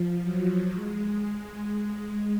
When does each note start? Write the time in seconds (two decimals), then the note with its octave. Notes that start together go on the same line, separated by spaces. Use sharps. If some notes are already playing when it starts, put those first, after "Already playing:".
Already playing: F3
0.22 F#3
0.74 G#3